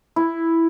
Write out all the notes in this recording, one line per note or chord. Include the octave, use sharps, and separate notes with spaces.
E4